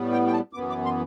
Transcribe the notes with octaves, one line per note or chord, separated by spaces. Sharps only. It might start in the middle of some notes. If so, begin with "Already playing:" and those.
Already playing: A2 G3 B3
G5
G5
A5
F#2 E3 B3 D6
D6
C6